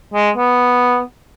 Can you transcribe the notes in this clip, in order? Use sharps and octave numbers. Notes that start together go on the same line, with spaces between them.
G#3
B3